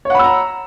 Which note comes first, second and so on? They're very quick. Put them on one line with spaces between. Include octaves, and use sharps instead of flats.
C#5 F#5 B5 E6 A#5